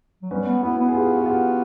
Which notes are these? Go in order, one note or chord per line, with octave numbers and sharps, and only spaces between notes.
F#3
G3 B3 C#4
B3
B3 E4 F#4
B3
G#4
F4 G4
F#4
F4 G4